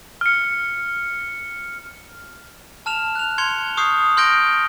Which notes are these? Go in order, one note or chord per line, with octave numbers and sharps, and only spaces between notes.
F6 C#7
A5 F6 E7 F7
F#6 F7
C6 G#6 C#7 F7 G7
C#6 D#6 F6 G6 C7
C6 F6 G6 A#6 D7 G7